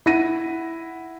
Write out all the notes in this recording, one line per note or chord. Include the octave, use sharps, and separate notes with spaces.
E4 F#5 A#6 D#7